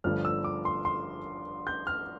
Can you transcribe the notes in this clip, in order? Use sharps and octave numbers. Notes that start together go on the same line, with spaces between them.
G1 G2 F3 A3 D4 F6
E6
D6
C6
C6
G6
F6